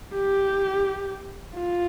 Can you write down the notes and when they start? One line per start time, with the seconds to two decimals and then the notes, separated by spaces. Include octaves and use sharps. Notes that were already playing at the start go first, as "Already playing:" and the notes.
0.14 G4
1.55 F4